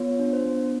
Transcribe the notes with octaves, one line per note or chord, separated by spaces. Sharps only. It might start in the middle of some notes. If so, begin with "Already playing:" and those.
Already playing: B3 F4 C#5
D4
C5
B3